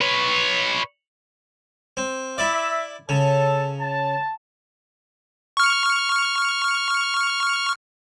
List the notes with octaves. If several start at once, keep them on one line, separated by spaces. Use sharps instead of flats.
B4 C#5
C4
E4 D5 E5
C#3 A4 A5
A5
C#6 F6